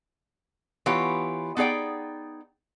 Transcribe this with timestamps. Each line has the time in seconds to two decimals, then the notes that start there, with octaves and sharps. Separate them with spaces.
0.86 E3 B3 F4 G4 C#5
1.57 B3 D#4 G#4 D5 G5